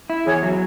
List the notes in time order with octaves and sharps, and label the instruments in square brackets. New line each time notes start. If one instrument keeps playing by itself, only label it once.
[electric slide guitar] E4
[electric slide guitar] E2 [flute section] G#4 C#5
[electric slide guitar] F#3